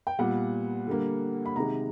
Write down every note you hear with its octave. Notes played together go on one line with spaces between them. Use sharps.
G5
A#2 G3 B3 F#5
D3 G3 A#3
B5
C3 D#3 G#3 A#5